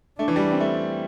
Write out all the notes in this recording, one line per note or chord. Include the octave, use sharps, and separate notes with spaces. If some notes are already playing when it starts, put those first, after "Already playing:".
A3 D4
E3
G3
C4
A3